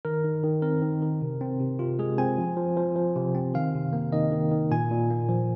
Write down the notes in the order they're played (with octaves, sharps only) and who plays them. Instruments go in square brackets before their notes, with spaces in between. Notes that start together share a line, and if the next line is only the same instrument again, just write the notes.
[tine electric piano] D#3 A#4
D#3
D#3
C4 A#4
D#3
D#3
C3
C4
C3
C3 F4
G#3 G#4
C4 G#5
F3
F3
F3
F3
C3
C4
D#3 F5
C3
A#3
D#3 D#5
D#3
D#3
A#2 G#5
A#2
A#3
F3